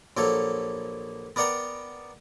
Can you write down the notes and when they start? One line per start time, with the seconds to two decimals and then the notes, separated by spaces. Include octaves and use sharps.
0.17 A#1 F#3 A#3 A4
1.36 B3 A#4 D5 F#5 G5 A#5